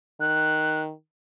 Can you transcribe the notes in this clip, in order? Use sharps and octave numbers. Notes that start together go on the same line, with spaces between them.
D#3 F#6